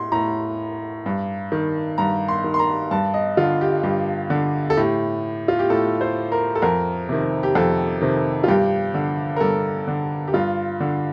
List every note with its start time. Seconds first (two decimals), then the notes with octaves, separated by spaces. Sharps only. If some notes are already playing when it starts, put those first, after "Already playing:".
Already playing: A2 C6
0.12 A2 A#5
1.06 G2
1.52 D#3
1.98 G2 A#5
2.28 C6
2.44 D#3
2.54 C6
2.59 A#5
2.91 G2 A5
3.14 D#5
3.37 D3 F4
3.61 G4
3.83 G2 G4
4.30 D3
4.70 A4
4.77 A2 G4
5.48 F4
5.59 G4
5.70 A2 A4
6.01 C5
6.32 A#4
6.55 A4
6.62 F2 A#4
7.09 C3 D#3
7.43 G4
7.55 F2 A4
8.02 C3 D#3
8.44 F4
8.48 G2 G4
8.94 D3
9.36 A#4
9.40 G2 A4
9.88 D3
10.27 G4
10.33 G2 F4
10.80 D3